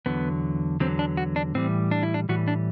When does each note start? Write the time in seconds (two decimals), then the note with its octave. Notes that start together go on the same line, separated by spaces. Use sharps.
0.06 E2 D3 F#3 B3
0.80 E2 D3 F#3 C4
0.99 D4
1.17 F#4
1.36 D4
1.55 A2 E3 G3 C4
1.91 D4
2.03 E4
2.14 D4
2.29 A2 E3 G3 F#4
2.48 D4